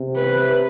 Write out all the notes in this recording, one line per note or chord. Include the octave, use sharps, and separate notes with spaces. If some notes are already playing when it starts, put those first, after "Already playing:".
Already playing: C3
B4